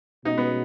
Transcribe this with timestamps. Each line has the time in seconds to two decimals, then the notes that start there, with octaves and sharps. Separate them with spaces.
0.25 B2 G#3 C#4 D#4 F#4
0.38 B3